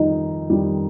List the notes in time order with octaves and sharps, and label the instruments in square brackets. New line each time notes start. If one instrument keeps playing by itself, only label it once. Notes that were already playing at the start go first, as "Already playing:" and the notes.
Already playing: [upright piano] F2 D#3 G3 [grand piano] D#4
[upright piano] F2 D#3 G3